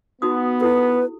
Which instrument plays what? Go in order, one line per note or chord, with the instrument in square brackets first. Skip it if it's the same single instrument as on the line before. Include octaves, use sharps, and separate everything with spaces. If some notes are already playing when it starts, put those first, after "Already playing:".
[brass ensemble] B3 [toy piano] D#4 F#4 D#6
[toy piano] E4 G4 A4 [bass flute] B4